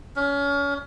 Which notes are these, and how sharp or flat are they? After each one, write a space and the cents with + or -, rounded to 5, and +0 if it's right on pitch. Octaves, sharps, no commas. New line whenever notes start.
C#4 +30